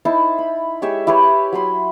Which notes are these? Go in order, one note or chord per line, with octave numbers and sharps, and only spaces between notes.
D#4 E4 C5 A5
B5
G#3 G4 C#5 E5
E4 G4 B4 C#5
F#3 B5 C6